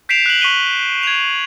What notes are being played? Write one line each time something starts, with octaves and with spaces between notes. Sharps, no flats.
G6 B6 C7 D7 E7 F7
F#6 F#7
C#6 B6 D#7 G7
G#6 F7